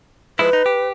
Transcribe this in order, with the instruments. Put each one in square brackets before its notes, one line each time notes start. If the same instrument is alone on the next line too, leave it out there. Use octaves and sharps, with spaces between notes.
[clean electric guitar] F3 G#3 E4 [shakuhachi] B4
[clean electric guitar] D#4
G4